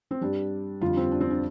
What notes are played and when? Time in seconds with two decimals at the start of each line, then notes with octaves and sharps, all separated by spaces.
0.11 C4
0.21 G2 G3 D4
0.81 F2 D3 G3 F4
0.97 C4
1.11 D4
1.20 C4
1.30 D4